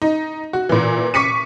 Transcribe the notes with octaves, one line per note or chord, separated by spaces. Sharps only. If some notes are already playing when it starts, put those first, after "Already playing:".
D#4
F#4
A#2 E3
C#6 D6 B6 C#7 D#7